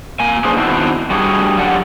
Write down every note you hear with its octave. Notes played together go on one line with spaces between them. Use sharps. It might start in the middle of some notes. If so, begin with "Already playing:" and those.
A#3 G#5
C#4 D4 G#4 B4 C5
D#3 B3 C4 D4 E4 F#4
G3 D4 F#4 G#4
F#2 D3 G4 D5 F#5